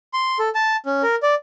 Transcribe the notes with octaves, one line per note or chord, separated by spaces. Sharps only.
C6
A4
A5
C#4
A#4
D5